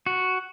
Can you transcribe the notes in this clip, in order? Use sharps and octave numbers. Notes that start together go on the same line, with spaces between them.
F#4